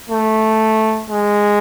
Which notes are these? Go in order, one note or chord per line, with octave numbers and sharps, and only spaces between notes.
A3
G#3